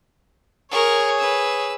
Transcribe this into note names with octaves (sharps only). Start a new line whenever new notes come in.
G#4 A#4 C#5 C#6
B4 E6